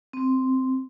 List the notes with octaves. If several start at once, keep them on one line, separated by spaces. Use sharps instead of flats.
C4